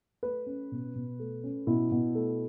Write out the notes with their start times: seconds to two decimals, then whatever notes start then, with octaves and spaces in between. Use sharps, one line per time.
0.23 A3 B4
0.46 C#4
0.72 B2
0.95 B2
1.20 A3
1.44 C#4
1.67 B2 E4
1.92 B2
2.15 A3